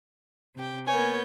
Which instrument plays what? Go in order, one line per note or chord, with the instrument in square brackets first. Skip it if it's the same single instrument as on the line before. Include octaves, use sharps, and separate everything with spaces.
[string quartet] C3 G4 G5
[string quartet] A#3 B3 G6 [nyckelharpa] A#4 C#5 [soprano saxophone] G#5